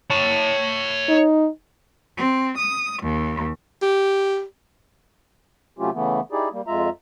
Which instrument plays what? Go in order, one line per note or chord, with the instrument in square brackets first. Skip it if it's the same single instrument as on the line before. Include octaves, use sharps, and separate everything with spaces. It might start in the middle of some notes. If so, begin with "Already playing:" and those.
[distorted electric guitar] C#5 A5
[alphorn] D#4
[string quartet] C4
D#6
D#2
[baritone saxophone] G4
[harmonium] C3 F#3 A3 C#4 F4 G4
C#3 E3 A3 B3
D#4 E4 G4 G#4 D5
G3 A#3
F2 G#3 F4 E5 A#5